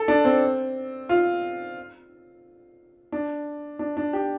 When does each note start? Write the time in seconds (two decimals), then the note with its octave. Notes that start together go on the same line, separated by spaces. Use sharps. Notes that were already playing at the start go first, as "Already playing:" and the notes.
Already playing: A4
0.08 D4
0.25 C4
1.09 F4
3.12 D4
3.79 D4
3.97 D4
4.13 G4